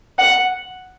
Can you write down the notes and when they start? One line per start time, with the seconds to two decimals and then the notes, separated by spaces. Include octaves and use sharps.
0.18 F#5